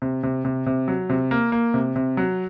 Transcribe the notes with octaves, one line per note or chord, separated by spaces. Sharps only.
C3
C3
C3
C3
F#3
C3
A#3
A#3
C3
C3
F#3